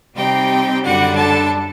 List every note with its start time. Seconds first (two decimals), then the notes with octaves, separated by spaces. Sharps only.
0.16 C3 G3 C4 D#4 G4 G5
0.84 F#2 D3 G3 D4 F#4 F#5
1.17 A4 A5